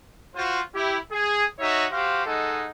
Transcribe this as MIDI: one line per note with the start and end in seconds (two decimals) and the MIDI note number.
0.35 0.60 65
0.35 0.60 66
0.35 0.60 72
0.74 0.97 64
0.74 0.97 67
1.12 1.44 68
1.59 1.86 63
1.59 1.86 66
1.59 1.86 73
1.59 1.86 76
1.91 2.25 66
1.91 2.25 67
1.91 2.25 72
1.91 2.25 77
2.26 2.70 56
2.26 2.70 63
2.26 2.70 69
2.26 2.70 78